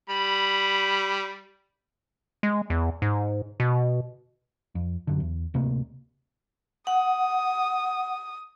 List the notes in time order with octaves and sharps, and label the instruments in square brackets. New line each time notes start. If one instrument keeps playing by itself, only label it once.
[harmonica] G3 B5
[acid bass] G#3
E2
G#2
B2
[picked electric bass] F2
F#2 D3
E2
D1 C3 A3 A#3
[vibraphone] F#5 [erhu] D#6